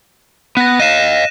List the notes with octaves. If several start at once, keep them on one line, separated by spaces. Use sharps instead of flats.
B3 F#6 A#6
D#5 F5 D#7 E7